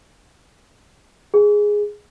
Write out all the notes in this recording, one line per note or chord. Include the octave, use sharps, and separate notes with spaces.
G#4